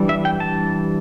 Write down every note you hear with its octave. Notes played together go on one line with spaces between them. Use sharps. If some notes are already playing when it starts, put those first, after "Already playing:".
Already playing: E3 G3 D4
E5
G5
A5